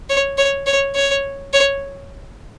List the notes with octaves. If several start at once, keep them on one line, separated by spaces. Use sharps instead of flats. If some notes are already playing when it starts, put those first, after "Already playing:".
C#5
C#5
C#5
C#5
C#5